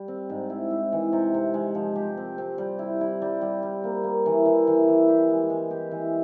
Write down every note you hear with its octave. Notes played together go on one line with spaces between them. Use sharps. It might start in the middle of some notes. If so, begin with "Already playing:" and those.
Already playing: G3
C4
G#2
E4
E4
E3
C3
C3
G#3
F3
G4
C4
C4
G3
E4
E4
G3
G3
G3
A#3
A#3
E3
E3
E3
E3
G4
G#3
G#3
G4
E3